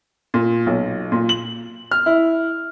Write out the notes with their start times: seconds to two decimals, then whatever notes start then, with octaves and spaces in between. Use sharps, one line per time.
0.34 A#2
0.67 B1
1.12 A#2
1.29 F#7
1.91 F6
2.06 E4